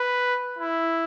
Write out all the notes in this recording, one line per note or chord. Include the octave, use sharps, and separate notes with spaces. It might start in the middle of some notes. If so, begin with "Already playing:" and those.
Already playing: B4
E4